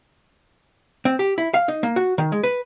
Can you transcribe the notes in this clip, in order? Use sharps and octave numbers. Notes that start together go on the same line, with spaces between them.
C4
G4
E4
F5
D#4
A#3
F#4
D#3
G#3
B4